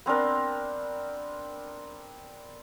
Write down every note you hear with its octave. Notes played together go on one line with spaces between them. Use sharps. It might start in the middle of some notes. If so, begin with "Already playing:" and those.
B3 C4 D4 A#4